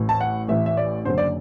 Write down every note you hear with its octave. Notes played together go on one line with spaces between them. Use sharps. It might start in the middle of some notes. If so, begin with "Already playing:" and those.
Already playing: A1 A2 E3
A5
F#5
A1 A2 E3 E5
E5
D5
F#1 F#2 D3 C5
D5